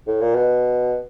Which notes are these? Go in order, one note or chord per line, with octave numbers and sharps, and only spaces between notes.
A2
A#2
B2